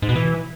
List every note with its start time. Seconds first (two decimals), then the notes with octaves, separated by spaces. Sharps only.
0.02 G#2
0.09 B2
0.15 E3